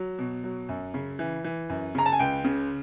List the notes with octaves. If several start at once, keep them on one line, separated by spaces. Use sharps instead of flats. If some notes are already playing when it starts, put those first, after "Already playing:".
Already playing: F#3
B2
F#3
F#2
C#3
E3
E3
F#2
C#3 A#5
A5
G#5
C#2 G5
C#3